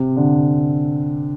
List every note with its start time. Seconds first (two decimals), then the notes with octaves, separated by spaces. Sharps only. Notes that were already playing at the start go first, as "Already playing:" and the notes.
Already playing: C3
0.17 D3